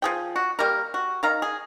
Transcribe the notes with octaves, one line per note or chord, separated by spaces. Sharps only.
F3 G#4 G5
F#4
G3 A#3 A#4
F#4
D#3 F5 A#5
G#4